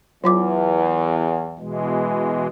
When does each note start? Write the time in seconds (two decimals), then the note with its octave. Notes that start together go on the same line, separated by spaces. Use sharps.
0.24 E2 F#3 F4 D6
1.59 B2 E3 G#3